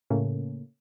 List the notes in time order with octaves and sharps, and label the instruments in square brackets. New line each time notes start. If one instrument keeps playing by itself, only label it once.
[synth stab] A2 C#3 A3 A#3 C#4